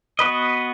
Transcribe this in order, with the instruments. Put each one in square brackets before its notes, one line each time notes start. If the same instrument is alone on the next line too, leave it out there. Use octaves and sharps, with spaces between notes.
[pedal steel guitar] B3 F#4 B4 D#5